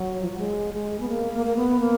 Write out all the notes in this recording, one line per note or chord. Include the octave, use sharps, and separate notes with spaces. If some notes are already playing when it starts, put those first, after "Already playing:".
Already playing: F#3
F3
F#3
G#3
G#3
B3
A#3
A#3
A#3
B3
A#3